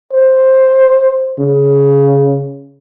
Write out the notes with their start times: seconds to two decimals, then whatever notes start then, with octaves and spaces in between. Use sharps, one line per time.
0.13 C5
1.39 C#3